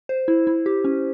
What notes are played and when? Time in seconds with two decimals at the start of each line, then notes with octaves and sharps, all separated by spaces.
0.09 C5
0.28 E4
0.47 E4
0.66 G4
0.84 C#4